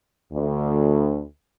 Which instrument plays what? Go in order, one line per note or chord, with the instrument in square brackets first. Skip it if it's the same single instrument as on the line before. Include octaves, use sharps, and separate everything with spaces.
[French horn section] D2